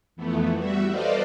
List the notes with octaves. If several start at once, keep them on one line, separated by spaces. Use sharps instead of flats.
F2 E3 A3 B3
G3 F#4 E5
A4 B4 C5 D5 D#5 F5